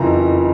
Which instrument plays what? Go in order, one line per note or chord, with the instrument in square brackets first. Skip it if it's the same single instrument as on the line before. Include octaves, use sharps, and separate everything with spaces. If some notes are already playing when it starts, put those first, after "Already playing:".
Already playing: [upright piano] F#1 F2 C#3 E3 A#5